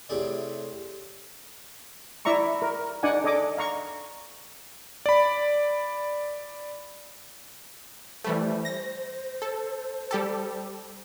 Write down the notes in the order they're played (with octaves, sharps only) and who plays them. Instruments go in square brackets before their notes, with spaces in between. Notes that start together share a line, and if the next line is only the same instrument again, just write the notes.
[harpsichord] A2 C3 G#4 D5
[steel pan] E4 D5 E5 A#5 C#6
A#4
D4 D#4 D5 F#5 G#5
A4 D5 D#5 G#5 D6
F5 A#5 C#6
[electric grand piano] D5 B5
[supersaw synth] E3 G3 A3 [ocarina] C5
[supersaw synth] A#6
A4
G3 G4 A4